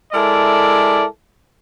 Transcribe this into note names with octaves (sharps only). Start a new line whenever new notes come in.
G#3 E4 A4 A#4 D5 E5